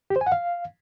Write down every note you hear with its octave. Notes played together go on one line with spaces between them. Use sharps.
G4
C5
G#5
F#5
F5